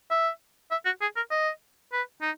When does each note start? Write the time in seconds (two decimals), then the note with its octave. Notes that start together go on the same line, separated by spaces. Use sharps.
0.11 E5
0.71 E5
0.85 F#4
1.02 G#4
1.16 A#4
1.31 D#5
1.92 B4
2.22 D#4